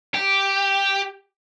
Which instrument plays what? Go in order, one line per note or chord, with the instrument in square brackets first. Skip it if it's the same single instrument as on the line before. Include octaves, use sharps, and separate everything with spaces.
[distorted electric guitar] G4